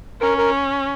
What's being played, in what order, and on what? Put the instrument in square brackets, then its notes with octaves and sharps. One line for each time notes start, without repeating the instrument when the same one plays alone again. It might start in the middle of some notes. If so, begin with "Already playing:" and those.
[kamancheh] C#4 [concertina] A#4
[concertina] A#4